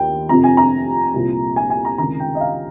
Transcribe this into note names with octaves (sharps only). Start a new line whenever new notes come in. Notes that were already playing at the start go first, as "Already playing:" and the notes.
Already playing: D#2 D#3 G5
F2 C3 F3 A#5
G#5
A#5
C2 A#2 F3
G#5
G#5
A#5
C#2 C3 D#3 A#5
G5
D#5
F5